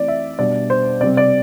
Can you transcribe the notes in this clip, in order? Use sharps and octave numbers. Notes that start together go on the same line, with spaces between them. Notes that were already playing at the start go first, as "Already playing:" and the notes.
Already playing: E3 A3 C4 D5
E5
B2 G3 D4 D5
C5
C3 G3 C4 D5
D5